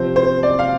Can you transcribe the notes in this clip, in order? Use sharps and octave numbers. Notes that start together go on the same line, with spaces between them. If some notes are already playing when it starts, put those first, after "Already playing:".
Already playing: C3 F3 C4 C5
C5
D5
F5